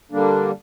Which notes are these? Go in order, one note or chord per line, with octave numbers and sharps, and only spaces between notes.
D3 G3 A#3 D4